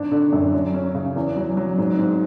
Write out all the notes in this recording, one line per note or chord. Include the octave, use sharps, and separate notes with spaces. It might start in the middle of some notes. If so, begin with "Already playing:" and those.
Already playing: G#1 D4
D3
F#2
F#3
C#4
C#3
E2
F#3
F#3
G#2
G#2